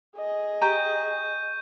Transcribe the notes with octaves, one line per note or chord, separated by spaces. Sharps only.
G#4 D#5
G4 G5 A#5 C#6 G6 D#7